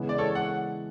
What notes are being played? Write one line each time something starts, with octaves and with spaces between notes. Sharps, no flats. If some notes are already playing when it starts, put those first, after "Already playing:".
Already playing: C#3 E3 G#3 B3
D5
A4 C#5
F#5